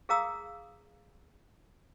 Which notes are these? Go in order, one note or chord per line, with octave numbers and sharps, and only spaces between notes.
G#4 A#4 F5 A#5 D#6 E6